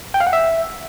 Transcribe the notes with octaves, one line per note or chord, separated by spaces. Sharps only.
G5
F5
F#5
E5